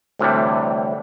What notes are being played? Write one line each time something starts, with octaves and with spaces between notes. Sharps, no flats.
D2 A2 C3 E3 G3